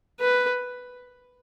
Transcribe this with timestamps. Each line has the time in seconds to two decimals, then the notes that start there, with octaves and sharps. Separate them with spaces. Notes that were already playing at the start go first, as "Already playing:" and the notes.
0.20 B4